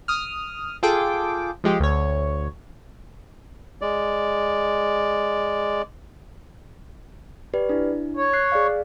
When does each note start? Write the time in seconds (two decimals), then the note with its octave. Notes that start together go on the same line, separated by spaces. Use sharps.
0.08 D#6 F6
0.83 F4 G#4 A4 G5 D6
1.64 F3 G#3 G4
1.80 D2 C#5
3.81 G#3 D5
7.54 G4 B4 D5
7.69 D4 E4
8.17 C#5
8.33 C#6 F#6 C7
8.52 G#4 D5 F5